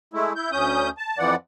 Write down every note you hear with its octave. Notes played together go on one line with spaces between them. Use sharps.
G#3 A3 E4
E4 G6
D2 C#4 D#6 G6
A5
F2 E3 F3 D5 F#5